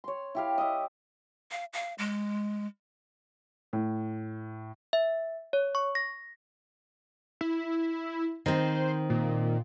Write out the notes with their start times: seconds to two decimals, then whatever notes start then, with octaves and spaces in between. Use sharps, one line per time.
0.04 C#5 C6
0.35 E4 G4 F5
0.58 D#5 E5
1.51 F5
1.73 F5
1.98 G#3
3.73 A2
4.93 E5
5.53 C#5
5.75 C#6
5.95 A#6
7.41 E4
8.46 D#3 C4 C5
9.10 A#2